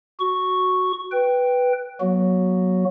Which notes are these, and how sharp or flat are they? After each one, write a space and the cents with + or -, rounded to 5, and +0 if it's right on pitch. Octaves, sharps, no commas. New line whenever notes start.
F#4 +0 C#6 +0
B4 +0 G5 +0
F#3 +0 B3 -45 F#4 +0